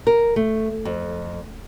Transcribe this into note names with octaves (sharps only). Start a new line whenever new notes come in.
A#4
A3
F2